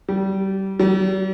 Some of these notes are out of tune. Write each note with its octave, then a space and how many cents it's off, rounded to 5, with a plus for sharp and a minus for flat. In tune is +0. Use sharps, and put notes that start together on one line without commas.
G3 -25
G3 -45